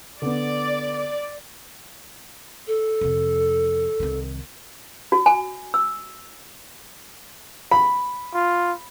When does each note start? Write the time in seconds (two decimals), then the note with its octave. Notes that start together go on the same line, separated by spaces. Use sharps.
0.22 D3 B3 D5
2.67 A4
3.01 F2 C3
4.00 C2 D#3
5.12 F#4
5.26 G#5
5.74 E6
7.71 B5
8.34 F4